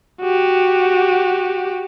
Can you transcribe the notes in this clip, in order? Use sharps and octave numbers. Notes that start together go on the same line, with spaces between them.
F#4 G4